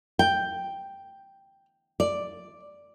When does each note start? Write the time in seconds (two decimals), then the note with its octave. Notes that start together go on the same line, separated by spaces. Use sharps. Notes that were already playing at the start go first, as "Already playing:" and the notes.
0.19 G5
2.00 D5